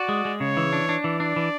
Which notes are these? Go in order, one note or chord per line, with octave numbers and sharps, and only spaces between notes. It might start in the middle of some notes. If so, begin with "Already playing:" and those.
Already playing: F#4 D5
G#3
G#3
C#3 C#5
E3
D4
D4
E3 D5
D4
E3